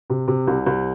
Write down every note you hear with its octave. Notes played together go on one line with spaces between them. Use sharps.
C3
C3
C2
C2